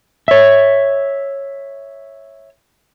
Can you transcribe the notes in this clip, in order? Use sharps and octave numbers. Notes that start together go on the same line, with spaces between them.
C#5 E5